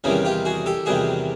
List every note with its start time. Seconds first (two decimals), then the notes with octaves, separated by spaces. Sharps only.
0.04 E2 C3 D#3 G3 C#4 D#4
0.25 F4 G4
0.45 F#4 G#4
0.66 G4 A4
0.86 E2 C3 D#3 G3 F#4 G#4